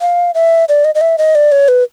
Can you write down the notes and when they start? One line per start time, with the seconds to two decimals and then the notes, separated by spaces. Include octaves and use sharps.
0.01 F5
0.35 E5
0.69 D5
0.85 D#5
0.95 D#5
1.01 E5
1.18 D#5
1.35 D5
1.52 C#5
1.68 B4